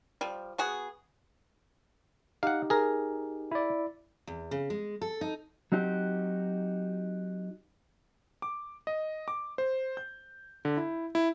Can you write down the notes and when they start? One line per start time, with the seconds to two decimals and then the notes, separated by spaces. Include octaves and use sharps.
0.21 F3 G3
0.58 B3 F#4 G#4
2.43 D#4 G4 F5 F#5
2.70 G#4 A#4
3.51 E4 D5
4.27 E2
4.51 C#3
4.70 G#3
5.01 A4
5.21 D#4
5.72 F#3 C4 D#4 F#4 G4
8.42 D6
8.87 D#5
9.28 D6
9.58 C5
9.97 G6
10.65 D3
10.77 E4
11.15 E4